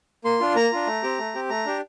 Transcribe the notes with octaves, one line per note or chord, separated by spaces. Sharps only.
A#3 C6
D4 F4
A#3 A#5
D4 F4
A3
C4 G4
A3
C4 G4
A3 A#5
D4 G4